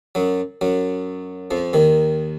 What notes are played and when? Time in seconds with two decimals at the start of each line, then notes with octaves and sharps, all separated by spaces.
0.15 F#2 F#3
0.61 F#2 F#3
1.51 F2 F3
1.73 D#2 D#3